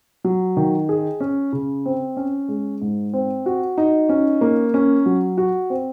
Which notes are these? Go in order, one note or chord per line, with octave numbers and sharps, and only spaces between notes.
F#3
D#3
G#4
C#4
C#3
C4
C#4
G#3
G#2
C4
F#4
D#4
C#4
A#3
C#4
F#3
F#4
C4